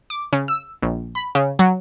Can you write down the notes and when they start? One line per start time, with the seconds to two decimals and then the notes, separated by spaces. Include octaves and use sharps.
0.10 D6
0.33 C#3
0.48 E6
0.82 A#1
1.15 B5
1.35 C#3
1.59 F#3